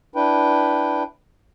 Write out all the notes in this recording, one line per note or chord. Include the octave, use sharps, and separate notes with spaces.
D4 E4 B4 G5